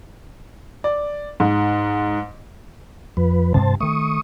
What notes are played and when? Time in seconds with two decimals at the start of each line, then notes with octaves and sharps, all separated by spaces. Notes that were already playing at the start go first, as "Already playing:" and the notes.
0.84 D5
1.40 G#2
3.17 F2 F3 B4
3.54 G2 C3 C5 A5
3.80 D#3 A3 C#6 D#6